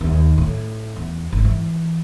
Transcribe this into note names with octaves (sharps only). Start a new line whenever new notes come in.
D#2
A2
E2
G#1
E3